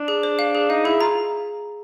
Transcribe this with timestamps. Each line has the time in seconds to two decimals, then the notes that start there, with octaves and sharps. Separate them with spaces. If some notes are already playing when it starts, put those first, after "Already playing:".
Already playing: D4
0.08 G#4
0.23 C5
0.39 F5
0.55 G#4
0.70 D#4 F5
0.85 E4 G#4
1.01 F4 A#5